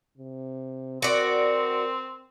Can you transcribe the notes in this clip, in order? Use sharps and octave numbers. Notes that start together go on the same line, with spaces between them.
C3
C4 F#4 A#4 D5